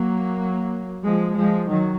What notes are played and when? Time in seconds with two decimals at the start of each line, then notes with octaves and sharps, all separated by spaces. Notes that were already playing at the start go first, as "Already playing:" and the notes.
Already playing: F#3 A#3
1.04 F3 G#3
1.35 F3 G#3
1.68 D#3 F#3